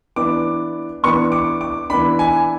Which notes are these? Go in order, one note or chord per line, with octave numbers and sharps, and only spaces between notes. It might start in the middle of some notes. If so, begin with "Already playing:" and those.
E3 B3 D4 D6
E3 B3 D4 C#6
D6
D6
E3 B3 D4 B5
G#5